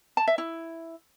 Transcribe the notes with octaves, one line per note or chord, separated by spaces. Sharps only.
A5
E5
E4